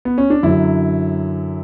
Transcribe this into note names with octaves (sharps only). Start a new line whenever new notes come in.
B3
C#4
D4
F#2 D3 F#3 E4